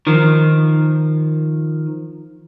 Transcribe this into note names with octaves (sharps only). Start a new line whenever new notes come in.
D#3 F3